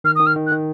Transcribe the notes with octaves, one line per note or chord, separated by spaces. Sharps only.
D#3 F6
D#6
D#3
F6
D#3
F#6
D#3